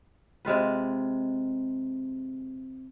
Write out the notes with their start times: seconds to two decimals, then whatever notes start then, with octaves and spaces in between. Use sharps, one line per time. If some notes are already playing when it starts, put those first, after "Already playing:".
0.45 C3 G#3 F4 B4